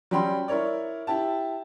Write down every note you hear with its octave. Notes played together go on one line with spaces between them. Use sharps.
F#3 G3 C#4 G5 B5 C6
E4 A#4 C#5 D5
E4 G4 A5